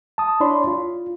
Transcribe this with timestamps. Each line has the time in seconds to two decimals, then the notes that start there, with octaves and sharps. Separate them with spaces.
0.18 A5 D#6
0.40 D4 E4 C#5 D5 B5 C6
0.67 F4